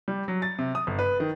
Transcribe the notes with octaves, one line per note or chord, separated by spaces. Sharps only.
G3
F#3
A6
C3
D#6
G1
B4
D#3